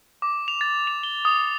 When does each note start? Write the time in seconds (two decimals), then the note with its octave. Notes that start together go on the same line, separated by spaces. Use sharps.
0.22 D6
0.48 F7
0.61 A6
0.87 F7
1.03 G7
1.25 D#6